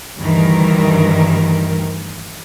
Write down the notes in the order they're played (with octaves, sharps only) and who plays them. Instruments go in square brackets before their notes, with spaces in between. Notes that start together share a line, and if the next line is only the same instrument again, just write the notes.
[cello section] D2 G2 D#3 E3 A#4